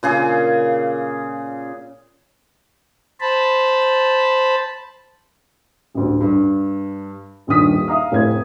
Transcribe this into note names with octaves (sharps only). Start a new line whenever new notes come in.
A#2 C#3 G#4
C5 A5 B5
A1 D2
G2
D#1 A#1 G2 D#3 D#6 B6
E5 F5 A#5 D#6
F1 A2 C4 G#6